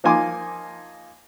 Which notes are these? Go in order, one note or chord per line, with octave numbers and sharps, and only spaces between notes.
F3 A#3 D#4 G#5 C6 D6